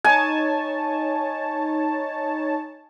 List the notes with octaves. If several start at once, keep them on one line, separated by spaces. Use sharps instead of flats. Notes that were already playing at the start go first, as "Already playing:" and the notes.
D#4 C#5 G#5 A5